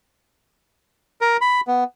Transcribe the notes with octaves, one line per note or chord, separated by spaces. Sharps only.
A#4
B5
B3